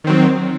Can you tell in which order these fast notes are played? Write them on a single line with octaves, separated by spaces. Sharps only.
D#3 C4 F#3